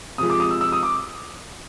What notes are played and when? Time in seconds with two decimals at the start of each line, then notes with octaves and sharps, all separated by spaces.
0.18 C3 F3 G#3 D#6
0.30 D6
0.40 D#6
0.51 E6
0.61 E6
0.72 D#6
0.83 D6